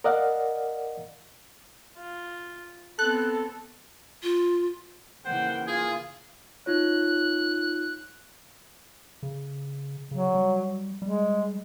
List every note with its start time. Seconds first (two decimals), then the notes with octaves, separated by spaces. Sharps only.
0.04 A#4 D5 D#5 F5 F#5
1.97 F4
2.99 B3 C4 A4 F#6
4.23 F4
5.25 C#3 E3 A#3 C5 F#5 G5
5.67 F4 G#4 G#5
6.66 D#4 F4 C#5 F#6
9.23 C#3
10.11 C#3 F#3
10.34 G3
11.02 G3 G#3